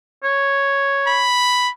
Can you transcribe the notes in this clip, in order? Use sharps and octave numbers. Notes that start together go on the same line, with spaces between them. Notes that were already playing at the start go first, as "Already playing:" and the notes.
C#5
B5